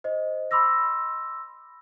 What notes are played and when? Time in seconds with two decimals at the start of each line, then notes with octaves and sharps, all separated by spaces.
0.04 C5 D#5
0.51 B5 C6 D6 E6 A#6